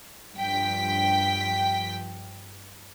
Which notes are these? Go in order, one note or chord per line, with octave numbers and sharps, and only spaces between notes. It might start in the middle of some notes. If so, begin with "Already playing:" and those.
G2 F3 G5 B6